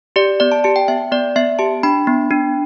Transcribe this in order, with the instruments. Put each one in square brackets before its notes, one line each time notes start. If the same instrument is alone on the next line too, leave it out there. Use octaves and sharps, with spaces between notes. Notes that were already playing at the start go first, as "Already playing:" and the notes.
[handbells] G4 D5
B3 D5
A5
G4 A5
G5
B3 E5
B3 D5
B3 E5
G4 A5
D4 B5
B3
D4